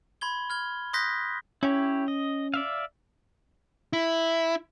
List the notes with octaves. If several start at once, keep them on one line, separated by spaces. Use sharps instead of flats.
B5 C6 G#6 G7
F6 G#6 G7
C6 D#6 F#6 G6 A#6 B6
C#4 E4 G4 C#5
D#5
D5 E5 F5
E4